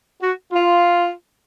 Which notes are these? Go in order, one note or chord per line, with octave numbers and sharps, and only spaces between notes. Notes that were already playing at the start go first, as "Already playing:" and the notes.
F#4
F4